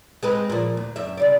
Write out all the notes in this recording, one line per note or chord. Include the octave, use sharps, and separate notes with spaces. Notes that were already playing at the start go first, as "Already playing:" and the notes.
G#3 C4 B4
A#2 F3
D2
F#2 E5
C#3 G3 D5